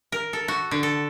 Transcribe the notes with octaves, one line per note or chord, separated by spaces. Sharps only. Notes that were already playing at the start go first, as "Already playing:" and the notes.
A#4
A4
F#4
D3
A4